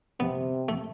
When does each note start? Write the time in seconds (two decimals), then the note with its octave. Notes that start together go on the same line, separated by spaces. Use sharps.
0.20 C3 B3
0.68 A3